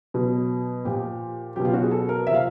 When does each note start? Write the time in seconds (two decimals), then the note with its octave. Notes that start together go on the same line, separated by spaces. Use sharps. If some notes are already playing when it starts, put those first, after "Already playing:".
0.14 B2 F#3
0.85 A#2 F3 G4
1.56 B2 F#3 G4
1.65 F4
1.74 F#4
1.83 G#4
1.91 A4
2.09 A#4
2.27 C3 F3 E5
2.35 F5